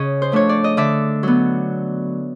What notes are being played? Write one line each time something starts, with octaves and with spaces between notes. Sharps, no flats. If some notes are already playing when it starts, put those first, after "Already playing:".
Already playing: C#3 C#5 D#5
C5
F3 A3 D4 C#5
D5
D#5
D3 D5 E5
F#3 B3